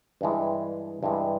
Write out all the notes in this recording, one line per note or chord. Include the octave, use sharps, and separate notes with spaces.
G2 E3 G#3
G2 E3 G#3